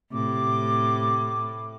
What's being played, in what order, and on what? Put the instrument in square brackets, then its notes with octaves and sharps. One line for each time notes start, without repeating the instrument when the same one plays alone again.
[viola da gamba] A2 [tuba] C3 [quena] D6